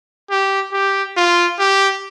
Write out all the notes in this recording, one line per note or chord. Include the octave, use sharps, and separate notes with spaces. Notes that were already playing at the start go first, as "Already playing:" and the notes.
G4
G4
F4
G4